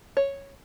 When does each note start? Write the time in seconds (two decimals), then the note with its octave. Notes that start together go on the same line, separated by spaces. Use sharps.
0.17 C#5